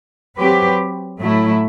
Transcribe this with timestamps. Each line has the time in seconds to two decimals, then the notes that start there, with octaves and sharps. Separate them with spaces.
0.37 F#3 C4 G4 B4
1.21 A2 F#3 A3 E4